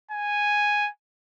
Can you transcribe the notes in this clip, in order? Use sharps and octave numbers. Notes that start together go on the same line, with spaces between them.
G#5